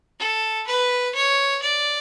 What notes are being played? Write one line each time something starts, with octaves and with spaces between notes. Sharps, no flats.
A4
B4
C#5
D5